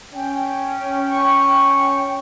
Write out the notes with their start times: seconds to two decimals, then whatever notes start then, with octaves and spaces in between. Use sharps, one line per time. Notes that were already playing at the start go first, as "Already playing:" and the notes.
0.14 C#4 G5
1.10 C#6